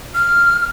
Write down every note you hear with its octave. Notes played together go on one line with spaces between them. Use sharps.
F6